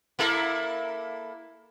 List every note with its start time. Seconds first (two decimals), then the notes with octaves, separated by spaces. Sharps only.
0.19 A#3 E4 A4